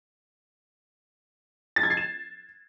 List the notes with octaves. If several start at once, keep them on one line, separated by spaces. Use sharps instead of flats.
A6
G#6
C7
E7